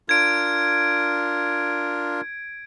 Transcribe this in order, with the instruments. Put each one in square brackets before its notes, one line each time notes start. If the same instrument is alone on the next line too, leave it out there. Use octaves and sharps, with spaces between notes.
[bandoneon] D4 F4 A#4 [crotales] G#6 D7